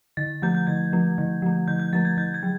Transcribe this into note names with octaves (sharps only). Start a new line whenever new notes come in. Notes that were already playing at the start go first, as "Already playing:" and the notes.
D3 A6
F3 A3 G6
G6
D3 G#6
F3 A3
D3
F3 A3
D3 G6
G6
F3 A3 A6
G#6
D3 G6
G#6
F#3